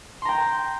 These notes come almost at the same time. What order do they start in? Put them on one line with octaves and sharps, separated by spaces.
C6 A#5 G5